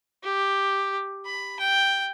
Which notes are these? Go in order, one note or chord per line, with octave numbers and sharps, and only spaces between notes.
G4
B5
G5